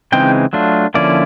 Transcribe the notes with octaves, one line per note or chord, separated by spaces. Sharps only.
C#3 E3 G#3 C4 D#4 G5
F#3 A3 D4 F4
D3 F3 A#3 C#4 E4 D5